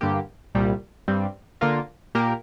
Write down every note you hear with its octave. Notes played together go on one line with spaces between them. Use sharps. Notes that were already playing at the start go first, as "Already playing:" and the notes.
G2 D3 A#3 G4
C2 A#2 G3
G2 G3 C4
D3 A#3 F4 A#4
A#2 A#3 G4 A#4